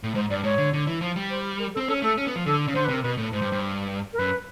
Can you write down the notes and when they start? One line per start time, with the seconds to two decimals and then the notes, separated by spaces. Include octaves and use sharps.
0.03 A2
0.15 G#2 C5
0.30 G2 D5
0.43 G#2 C#5
0.58 D3
0.73 D3
0.87 E3
1.01 F3
1.16 G3
1.30 C5
1.59 A#4
1.74 A4
1.77 C4
1.88 C#4 A4
2.02 A3 A4
2.17 C#4
2.27 B3
2.36 F3
2.46 D3 A4
2.67 C#3
2.74 D3 C5
2.85 C3 B4
2.93 A#4
3.03 B2 B4
3.17 A2
3.33 G#2 C5
3.42 G2
3.52 G2
4.13 A#4
4.19 F#2 B4